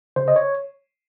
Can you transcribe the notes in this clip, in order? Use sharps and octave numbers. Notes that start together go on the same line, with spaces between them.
C#3 C5
D#5
C#5